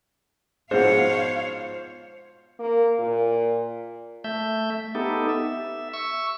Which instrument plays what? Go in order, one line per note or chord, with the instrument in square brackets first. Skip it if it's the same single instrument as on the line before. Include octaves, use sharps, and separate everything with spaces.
[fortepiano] G#2 B2 F3 [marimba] G#4 F#5 [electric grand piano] C5 [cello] C#5 F5
[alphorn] A#3
A#2
[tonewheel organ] A3 E5 G6
B3 D#4 G4 A4
E5
C#6 E6